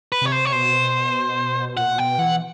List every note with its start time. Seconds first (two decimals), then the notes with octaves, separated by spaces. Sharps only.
0.12 B4
0.21 C3 C#5
0.32 C5
0.45 C#5
0.53 B2 C5
1.77 A#2 F#5
1.98 B2 G5
2.18 E3 F#5